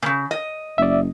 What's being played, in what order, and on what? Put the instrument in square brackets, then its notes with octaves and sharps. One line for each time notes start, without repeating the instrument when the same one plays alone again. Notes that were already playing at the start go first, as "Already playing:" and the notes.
[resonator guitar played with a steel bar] A#2 C#3
D#5
[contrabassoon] F#1 [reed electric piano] D5 E5